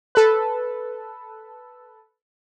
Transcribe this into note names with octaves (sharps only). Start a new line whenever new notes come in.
A4 B4